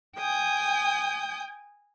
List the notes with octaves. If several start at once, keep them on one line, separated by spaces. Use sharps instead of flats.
G5 G#5 D#6 G6